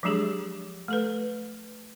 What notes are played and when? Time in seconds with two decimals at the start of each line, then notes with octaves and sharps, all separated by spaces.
0.03 F3 F#3 G#3 D4 G4 G#4
0.88 A3 A4 B4